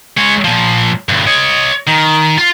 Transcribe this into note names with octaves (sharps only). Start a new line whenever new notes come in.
G#3 C#5
A#2 F3
D2 G2
C#5 D#5
D#3
F4